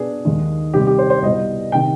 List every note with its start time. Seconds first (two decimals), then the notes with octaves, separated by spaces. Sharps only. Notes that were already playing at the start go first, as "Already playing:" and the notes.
Already playing: B2 B3 D4 G#4
0.25 D#2 D#3 G#3
0.74 C3 D#3 G3 C4 G4
0.87 G4
0.98 C5
1.10 C5
1.22 C2 B2 G3 B3 D#5
1.72 C3 D#3 G5